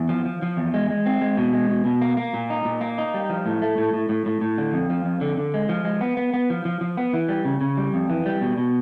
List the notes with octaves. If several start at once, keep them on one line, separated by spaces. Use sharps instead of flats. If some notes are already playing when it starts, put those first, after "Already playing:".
Already playing: E2
F3
F3
F3
E2
G#3
G#3
C4
G#3
B2
G#3
B2
B2
A#3
A#3
A#2
D#4
A#2
A#3
D#4
G3
F3
A2
A3
A2
A2
A2
A2
A2
D3
F2
F3
F2
D3
D3
G#3
F3
G#3
B3
B3
B3
F3
F3
F3
B3
E3
G3
C#3
C#3
G3
F2
E3
G3
B2
B2